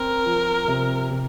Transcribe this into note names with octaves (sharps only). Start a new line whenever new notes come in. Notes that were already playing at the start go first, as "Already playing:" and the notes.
Already playing: C4 A#4
F3
C3
C3